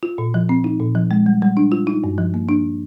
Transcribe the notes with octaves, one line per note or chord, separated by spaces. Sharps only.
F4
A#2
F3
C4
D#4
A#2
F3
G#3
G3
G3
D4
F4
D#4
G2
F3
A#3
D4